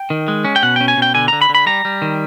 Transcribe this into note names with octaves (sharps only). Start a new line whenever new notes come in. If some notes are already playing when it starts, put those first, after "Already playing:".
Already playing: G5
D#3
G#3
C#4
G5
B2 F#5
C#4 G5
G#5
B2 G5
D3 G#5
D3 A#5
B5
D3
B5
G3 A#5
G3
D#3